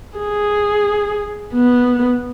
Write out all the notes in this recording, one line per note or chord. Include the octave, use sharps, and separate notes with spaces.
G#4
B3